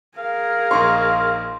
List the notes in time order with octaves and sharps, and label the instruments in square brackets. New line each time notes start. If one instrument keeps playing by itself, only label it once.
[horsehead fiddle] G#4 A#4 [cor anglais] F5
[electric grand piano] A#1 D#4 C#6 [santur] C6